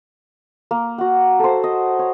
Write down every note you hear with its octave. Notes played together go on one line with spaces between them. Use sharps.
A#3
F#4 F#5
A4 C5
D#5
C#5